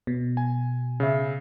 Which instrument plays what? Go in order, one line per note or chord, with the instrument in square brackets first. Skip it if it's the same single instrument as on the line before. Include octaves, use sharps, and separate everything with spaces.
[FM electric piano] B2
[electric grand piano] G#5
C#3 E5